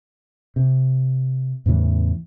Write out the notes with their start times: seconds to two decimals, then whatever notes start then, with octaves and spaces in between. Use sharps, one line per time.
0.56 C3
1.66 E2 A2 C#3 E3